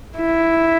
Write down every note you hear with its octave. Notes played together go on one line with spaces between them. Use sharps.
E4